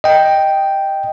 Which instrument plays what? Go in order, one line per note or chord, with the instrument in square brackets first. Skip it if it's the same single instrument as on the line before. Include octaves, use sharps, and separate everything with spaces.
[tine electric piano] D#5 G5